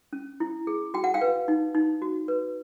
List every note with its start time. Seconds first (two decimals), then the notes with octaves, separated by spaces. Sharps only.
0.13 C#4
0.40 E4
0.67 G#4
0.94 F#4 G5
1.04 F#5
1.14 F5 G5
1.21 B4
1.48 D#4
1.74 D#4
2.02 F#4
2.28 B4